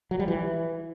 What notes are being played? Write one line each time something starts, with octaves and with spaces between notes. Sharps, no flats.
F#3
G3
E3